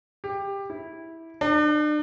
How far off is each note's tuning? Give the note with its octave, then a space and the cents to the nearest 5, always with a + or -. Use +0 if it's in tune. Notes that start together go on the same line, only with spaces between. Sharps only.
G4 +15
E4 -10
D4 +40